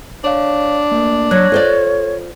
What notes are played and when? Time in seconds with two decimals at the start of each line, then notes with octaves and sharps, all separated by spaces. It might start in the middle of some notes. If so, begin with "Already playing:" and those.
0.24 D4 C#5 F5
0.91 A3 A#3
1.31 F#3 C#5 F#6 G#6 A#6
1.52 F4 A4 C5 D5